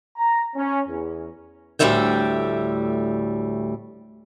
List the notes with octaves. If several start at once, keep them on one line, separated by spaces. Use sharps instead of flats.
A#5
C#4
E2
D2 A2 F#3 G3 E5 G5